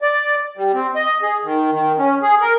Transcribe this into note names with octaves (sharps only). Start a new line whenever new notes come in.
D5
G3
C4
D#5
G#4
D#3
D#3
C#4
G#4
A#4